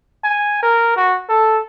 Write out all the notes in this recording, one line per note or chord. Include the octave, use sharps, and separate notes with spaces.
G#5
A#4
F#4
A4